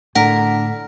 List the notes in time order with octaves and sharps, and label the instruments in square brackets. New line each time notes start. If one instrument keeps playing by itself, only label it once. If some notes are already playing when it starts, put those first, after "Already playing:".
[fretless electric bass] A2 [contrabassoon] D3 [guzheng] A#4 [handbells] F#5